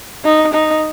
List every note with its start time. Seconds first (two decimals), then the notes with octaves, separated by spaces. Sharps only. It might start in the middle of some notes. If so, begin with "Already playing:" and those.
0.24 D#4
0.53 D#4